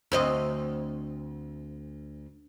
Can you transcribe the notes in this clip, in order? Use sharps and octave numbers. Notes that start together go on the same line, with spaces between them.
D2 C4 D#5